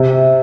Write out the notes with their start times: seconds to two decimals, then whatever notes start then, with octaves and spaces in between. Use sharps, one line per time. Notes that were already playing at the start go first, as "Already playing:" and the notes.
Already playing: C3